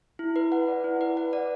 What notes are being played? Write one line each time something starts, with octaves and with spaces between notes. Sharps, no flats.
E4
B4
F#5
D5
E4
B4
F#5
D5